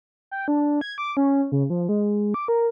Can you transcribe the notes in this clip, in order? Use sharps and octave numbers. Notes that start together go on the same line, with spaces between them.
G5
D4
G#6
D6
C#4
C#3
F3
G#3
D6
A#4